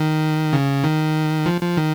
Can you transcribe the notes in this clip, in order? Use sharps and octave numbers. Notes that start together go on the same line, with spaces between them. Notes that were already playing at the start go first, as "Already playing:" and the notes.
Already playing: D#3
C#3
D#3
F3
F3
D#3